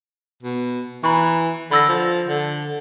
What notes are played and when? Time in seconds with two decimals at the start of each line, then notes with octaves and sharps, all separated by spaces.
0.43 B2
1.04 E3 A#5 B5 C#6
1.71 D3 B5 E6 A#6
1.89 F3
2.26 D3